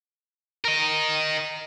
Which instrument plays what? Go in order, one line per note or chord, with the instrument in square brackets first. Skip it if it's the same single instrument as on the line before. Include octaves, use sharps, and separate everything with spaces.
[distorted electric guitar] A#4 D#5